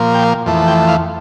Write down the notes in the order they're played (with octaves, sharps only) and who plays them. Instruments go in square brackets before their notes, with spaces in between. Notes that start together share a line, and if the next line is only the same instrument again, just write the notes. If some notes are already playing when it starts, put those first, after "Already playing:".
Already playing: [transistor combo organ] A#2 F3 A#3
G5
F2 E3 A3
G5
F5